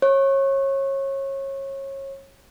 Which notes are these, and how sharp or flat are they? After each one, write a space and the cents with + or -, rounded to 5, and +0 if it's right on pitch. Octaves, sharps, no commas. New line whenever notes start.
C#5 -25